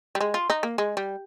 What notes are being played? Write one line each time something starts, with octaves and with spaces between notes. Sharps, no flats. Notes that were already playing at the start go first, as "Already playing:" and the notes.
G3
G#3
F4
D#4
A#3
G#3
G3